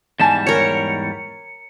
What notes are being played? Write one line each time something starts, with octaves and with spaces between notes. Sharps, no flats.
E2 G#2 G3 G#5 A5 E7
A#4 C#5 C#7